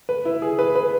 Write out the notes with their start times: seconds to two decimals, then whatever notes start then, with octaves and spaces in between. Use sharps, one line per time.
0.09 B4
0.25 E4
0.42 G#4
0.59 B4
0.75 B4